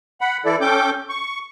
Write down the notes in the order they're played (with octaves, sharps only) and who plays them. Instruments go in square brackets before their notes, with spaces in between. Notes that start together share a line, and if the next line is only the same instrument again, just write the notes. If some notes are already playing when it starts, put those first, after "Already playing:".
[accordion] F#5 B5
E3 E4 A4 D5
C#4 A4 G5 D6 G6
C#6